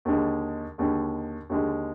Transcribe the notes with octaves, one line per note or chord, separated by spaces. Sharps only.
D#2 D3 G#3
D#2 D3 G#3
D#2 D3 G#3